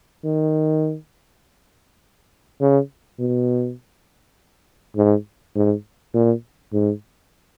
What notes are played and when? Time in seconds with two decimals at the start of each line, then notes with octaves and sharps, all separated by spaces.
0.25 D#3
2.61 C#3
3.19 B2
4.96 G#2
5.55 G#2
6.14 A#2
6.73 G#2